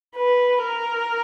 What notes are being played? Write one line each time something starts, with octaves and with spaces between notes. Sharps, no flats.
B4
A#4